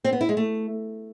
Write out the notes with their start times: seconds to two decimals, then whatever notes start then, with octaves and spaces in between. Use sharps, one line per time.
0.04 C4
0.13 B3
0.21 E4
0.29 G#3
0.37 A3